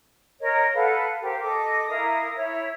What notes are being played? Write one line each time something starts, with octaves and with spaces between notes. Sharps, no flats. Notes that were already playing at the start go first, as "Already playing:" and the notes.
A#4 C#5 D#5
A4 B4 F5 F#5
G4 A#4 C5 F5
A4 D#5 D6
E4 A#4 F5 D#6
E4 C#5